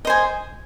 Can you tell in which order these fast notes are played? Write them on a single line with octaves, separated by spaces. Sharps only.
D#5 C5 G#5